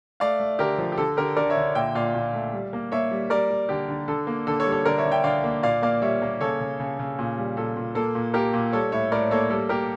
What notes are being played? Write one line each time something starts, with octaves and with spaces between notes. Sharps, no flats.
A3 D5 F5
A3
D3 G4 A#4
F3
G4
D3 A4
D3 G4 A#4
D3 A#4 D5
C#5 E5
D3
A#2 E5 G5
A#2 D5 F5
A#2
A3
G3
A#3
A#3 C#5 E5
G3
G3 A#4 D5
G3
D3 G4
D3
D3 A4
A#3
D3 A4
A4 C#5
G3
A4 C#5
D3 A#4 D5
C#5 E5
D3
E5 G5
D3 D5 F5
A#3
A#2 D5 F5
A#3 D5 F5
G3 C#5 E5
A#3
C#3 A4 C#5
C#3
C#3
C#3
A#2
G3
A#2 A4
A#2
A#3 A4
A#2
A#3 G4 A#4
A#2
G3 A4 C#5
A2 C#5 E5
A2 A#4 D5
A#3 A4 C#5
G3 A4
A#3 G4 A#4